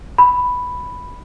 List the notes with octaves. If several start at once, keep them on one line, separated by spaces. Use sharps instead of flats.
B5